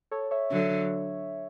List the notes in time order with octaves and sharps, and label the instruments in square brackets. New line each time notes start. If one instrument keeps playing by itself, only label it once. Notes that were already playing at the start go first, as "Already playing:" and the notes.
[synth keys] A4 C#5
C#5 E5
[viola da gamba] D3 F#3